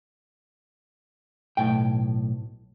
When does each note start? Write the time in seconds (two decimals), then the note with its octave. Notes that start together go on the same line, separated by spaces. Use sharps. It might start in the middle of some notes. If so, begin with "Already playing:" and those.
1.57 B1 A2 G5